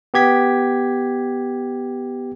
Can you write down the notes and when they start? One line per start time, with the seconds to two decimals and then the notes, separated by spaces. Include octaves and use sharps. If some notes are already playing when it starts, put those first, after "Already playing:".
0.14 B3 G4 G#6 B6